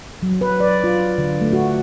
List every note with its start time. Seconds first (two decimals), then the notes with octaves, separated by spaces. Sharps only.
0.22 F#3
0.41 B4
0.60 D5
0.84 F4
1.18 D3
1.41 A3
1.53 F#4